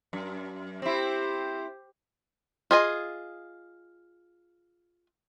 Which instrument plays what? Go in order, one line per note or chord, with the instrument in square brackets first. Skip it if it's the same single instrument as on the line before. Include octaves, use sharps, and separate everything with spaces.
[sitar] F#2
[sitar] C4 E4 [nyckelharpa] G4 C5
[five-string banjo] F4 G#4 D#5